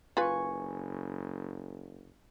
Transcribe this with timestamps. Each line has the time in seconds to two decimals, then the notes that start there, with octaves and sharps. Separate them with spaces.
0.17 F#1 F4 B4 F5 G#5 C#6